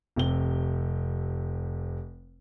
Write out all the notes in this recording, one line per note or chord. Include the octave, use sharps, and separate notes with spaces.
F1 C3 G7